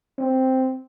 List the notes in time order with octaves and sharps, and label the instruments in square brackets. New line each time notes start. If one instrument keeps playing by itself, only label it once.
[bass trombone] C4